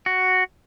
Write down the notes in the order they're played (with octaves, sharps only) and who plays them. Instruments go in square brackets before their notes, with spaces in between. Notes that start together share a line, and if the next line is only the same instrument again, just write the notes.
[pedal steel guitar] F#4